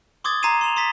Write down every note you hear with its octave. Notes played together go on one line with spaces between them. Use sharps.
C6 D6 D#6 G#6 A6
A#5 C6 G#6 C7 D#7 E7
C6 E7 F7
C6 D#6 A6 B6